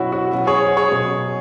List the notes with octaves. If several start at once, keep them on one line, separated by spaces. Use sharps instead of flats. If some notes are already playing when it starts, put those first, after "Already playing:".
Already playing: B2 F#3 C#4 E4 F#4
F#4
B2 F#3 C#4
G#4 C#5
G#4 C#5
B2 F#3 C#4